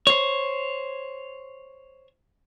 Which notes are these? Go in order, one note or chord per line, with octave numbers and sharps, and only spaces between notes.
C5 C#5